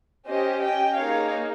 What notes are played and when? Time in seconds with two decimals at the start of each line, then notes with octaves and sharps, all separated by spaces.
0.28 C#4 G4 C5 D#5
0.62 D#5 G5
0.96 A#3 D#4 G#4 C#5 F5